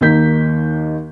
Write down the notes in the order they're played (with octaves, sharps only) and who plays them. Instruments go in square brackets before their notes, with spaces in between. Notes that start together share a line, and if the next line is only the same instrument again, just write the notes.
[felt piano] D#2 D#3 A#3 D#4 G6 B6